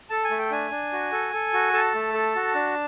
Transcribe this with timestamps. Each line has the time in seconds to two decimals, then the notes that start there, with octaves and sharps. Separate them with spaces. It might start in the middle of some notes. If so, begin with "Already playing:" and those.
0.10 A4 A5
0.24 G#5
0.31 A3
0.39 G5
0.51 D4 G#5
0.71 D4
0.93 F#4
1.12 A4
1.33 A4
1.53 F#4
1.73 A4 A5
1.94 A3
2.14 A4
2.35 F#4
2.55 D4